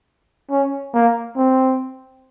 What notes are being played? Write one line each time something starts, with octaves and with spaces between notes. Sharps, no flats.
C#4
A#3
C4